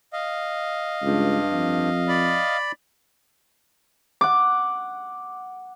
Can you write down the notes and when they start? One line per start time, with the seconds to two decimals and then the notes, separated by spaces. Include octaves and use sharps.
0.13 D#5 F5
1.03 C#2 G2
1.52 F2
2.08 D5 B5
4.21 F#5 D6